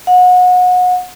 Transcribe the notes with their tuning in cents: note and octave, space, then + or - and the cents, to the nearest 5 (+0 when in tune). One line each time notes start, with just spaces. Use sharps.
F#5 -30